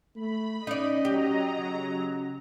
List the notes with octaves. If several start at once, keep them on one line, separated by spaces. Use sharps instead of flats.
A3 B5
C#4 D#4 D5 D#5
F#3 G4 A#5
C#3